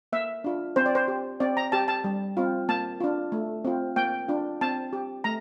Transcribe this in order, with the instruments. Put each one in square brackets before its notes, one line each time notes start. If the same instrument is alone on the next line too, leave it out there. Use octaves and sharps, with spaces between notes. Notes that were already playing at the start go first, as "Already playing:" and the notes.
[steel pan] A#3 E5
D4 F4
C4 C5
D5
C5
G4
C4 D5
A#5
G4 A5
A5
G3
C4 F4
A#3 A5
D4 F4
A3
C4 F4
A#3 G5
D4 F4
C4 A5
G4
A3 A#5